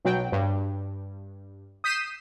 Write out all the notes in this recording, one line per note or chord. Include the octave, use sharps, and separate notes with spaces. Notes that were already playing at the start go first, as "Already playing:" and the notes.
B1 F#3 G5
G2
D#6 G6 B6 C7 D#7 E7